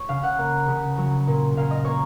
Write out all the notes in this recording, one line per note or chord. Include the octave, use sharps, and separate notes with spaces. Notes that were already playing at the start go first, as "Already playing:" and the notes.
Already playing: C#5
C#3 F5
F#5
A#3
C#3
F#3
A#2
A#2 F5
D#5
A#3 C#5